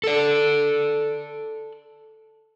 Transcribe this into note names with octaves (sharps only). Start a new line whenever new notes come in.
A4 D5